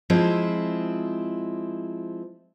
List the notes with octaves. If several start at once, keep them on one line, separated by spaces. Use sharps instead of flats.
F3 G#3 C4 E4